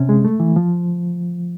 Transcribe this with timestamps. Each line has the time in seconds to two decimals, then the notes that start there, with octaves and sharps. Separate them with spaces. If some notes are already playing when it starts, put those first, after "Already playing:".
Already playing: C3 C#4
0.09 G#3
0.25 A3
0.40 E3
0.56 F3